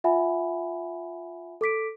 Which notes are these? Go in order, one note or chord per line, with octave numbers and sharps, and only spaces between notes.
F4 E5 F#5 G#5 B5
A4 D6 B6 D7